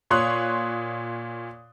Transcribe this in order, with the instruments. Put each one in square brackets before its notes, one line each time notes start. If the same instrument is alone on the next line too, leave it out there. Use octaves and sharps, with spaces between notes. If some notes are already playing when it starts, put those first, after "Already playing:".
[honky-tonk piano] A#2 C#5 C6 D#6 F#6